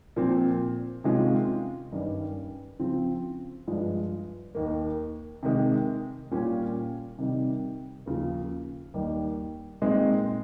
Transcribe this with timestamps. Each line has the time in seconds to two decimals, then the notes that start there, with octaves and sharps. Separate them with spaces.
0.16 A#2 F3 C4
1.04 C3 D#3 G#3 C#4 F4
1.92 G2 D#3 G3 C#4
2.79 C#3 F3 C4
3.67 G2 F3 G#3
4.55 D#2 D#3 A#3
5.43 C3 D#3 G#3
6.31 A#2 G3 C#4 F4
7.18 C3 D#3 G3
8.06 D#2 C#3 F3
8.94 D#2 D#3 G3
9.82 A#2 G#3 C4 D#4